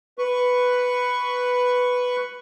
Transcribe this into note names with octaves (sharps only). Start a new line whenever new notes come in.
B4 C#6